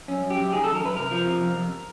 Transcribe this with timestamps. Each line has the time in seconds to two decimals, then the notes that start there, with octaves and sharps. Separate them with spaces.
0.08 F#2 C#4
0.23 F#2
0.30 G4
0.38 F#2
0.52 D#3 G#4
0.64 F#2 A4
0.75 A#4
0.82 F#2 B4
0.96 C3 A#4
1.11 F3
1.27 C3
1.41 F2
1.55 F2